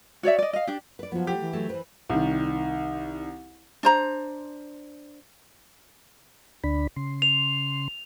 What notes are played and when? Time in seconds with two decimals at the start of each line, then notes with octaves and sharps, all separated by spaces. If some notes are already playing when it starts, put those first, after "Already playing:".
0.23 F#4 C#5 D5 E5
0.39 D5 D#5
0.53 D#5 F5
0.67 D4 G4
0.99 B4 D5
1.12 F3 F#3 B3
1.27 F#3 A3 G4
1.41 E3
1.53 F#3 A3 E4
1.70 E3 B4 C5
2.10 C2 D#3
3.83 D4 C5 A#5
6.64 D2 D4 B5
6.96 C#3 C6
7.22 F7